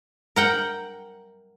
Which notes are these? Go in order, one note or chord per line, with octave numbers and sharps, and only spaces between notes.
A#4 F#5 G5